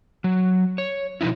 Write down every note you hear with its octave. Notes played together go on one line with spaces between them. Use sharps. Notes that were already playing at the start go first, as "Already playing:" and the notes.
F#3
C#5
B2 F3 D#4 E4